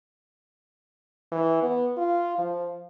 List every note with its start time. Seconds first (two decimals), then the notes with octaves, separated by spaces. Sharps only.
1.32 E3
1.63 B3
1.98 F4
2.39 F3